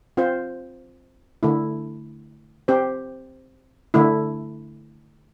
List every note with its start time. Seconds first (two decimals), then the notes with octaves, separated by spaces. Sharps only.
0.17 C4 F4 C5
1.43 D3 A3 E4
2.68 C4 G4 C5
3.94 D3 A3 E4